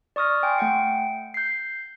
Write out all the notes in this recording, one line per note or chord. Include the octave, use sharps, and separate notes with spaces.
D5 C#6 D#6 F6 A#6
G5 G#5 C6
A3 F#5 G5 C#7
G6 C7